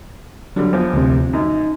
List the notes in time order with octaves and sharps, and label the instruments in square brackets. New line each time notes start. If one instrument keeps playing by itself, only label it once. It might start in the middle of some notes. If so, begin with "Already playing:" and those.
[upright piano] D3 G3 [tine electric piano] F#3
[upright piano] E2 F3
[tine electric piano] D2 C3
[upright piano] F#2 [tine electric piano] D#4